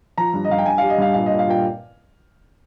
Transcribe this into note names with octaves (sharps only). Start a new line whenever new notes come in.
F3 A#5
G2
D#5
G2 F5
G5
G2 G#5
G3 F5
D#5
G2 F5
A#2 F5
A#2 D#5
F5
A#2 G5